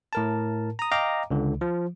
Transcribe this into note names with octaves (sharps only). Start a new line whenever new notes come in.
A2 A#4 A5
A#5 D#6
D#5 F5 G5 A#5 D6
C#2 D3
F3